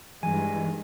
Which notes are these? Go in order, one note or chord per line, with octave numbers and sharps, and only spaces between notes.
G2 D#3 E3 G3 G#3 G#5